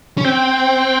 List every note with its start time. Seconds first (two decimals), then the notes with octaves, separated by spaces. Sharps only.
0.18 C#4
0.24 C4 G5